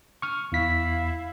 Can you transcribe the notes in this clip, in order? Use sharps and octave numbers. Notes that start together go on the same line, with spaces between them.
C#6 F6
E2 E4 F5 B6